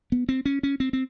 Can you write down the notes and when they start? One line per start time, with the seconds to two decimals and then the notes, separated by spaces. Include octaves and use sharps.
0.12 B3
0.29 C4
0.45 C#4
0.63 C#4
0.80 C4
0.93 C4